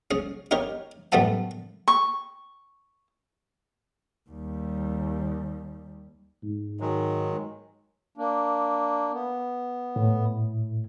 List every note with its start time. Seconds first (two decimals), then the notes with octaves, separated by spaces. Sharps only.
0.11 C#4 G#4
0.51 D#4 G4 A#4 C#5
1.12 A1 F#2 G3 A3 B3 A5
1.88 C#6
4.30 D#2 G3
6.43 G#2
6.80 D#3 F#3 G#3
8.18 A#3 D4
9.12 B3
9.96 A2